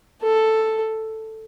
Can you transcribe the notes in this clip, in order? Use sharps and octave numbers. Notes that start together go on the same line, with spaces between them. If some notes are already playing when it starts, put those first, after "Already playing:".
A4